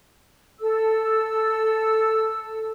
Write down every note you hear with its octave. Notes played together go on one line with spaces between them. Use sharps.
A4 E6